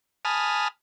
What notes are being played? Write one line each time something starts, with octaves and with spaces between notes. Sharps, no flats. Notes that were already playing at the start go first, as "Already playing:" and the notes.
G#5 A5 B5 D#6 F6